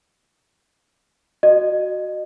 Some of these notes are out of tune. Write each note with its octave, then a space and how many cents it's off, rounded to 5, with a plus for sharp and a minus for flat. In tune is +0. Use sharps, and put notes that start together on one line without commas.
F#4 +0 D#5 -30